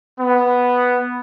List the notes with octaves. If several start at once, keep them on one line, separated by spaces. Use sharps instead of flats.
B3